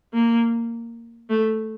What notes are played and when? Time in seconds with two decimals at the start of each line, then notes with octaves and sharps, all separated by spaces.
0.14 A#3
1.30 A3